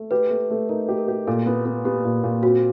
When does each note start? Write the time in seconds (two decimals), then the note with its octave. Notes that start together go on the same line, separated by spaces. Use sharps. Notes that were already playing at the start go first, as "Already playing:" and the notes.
Already playing: A3
0.11 G4 B4
0.30 A3
0.50 A3
0.69 D#4 A#4
0.89 G4
0.98 A#4
1.08 G4
1.27 A#2 A4
1.46 B3
1.65 B3
1.85 B3 G4
2.05 A#2
2.24 A#2
2.43 C4 F#4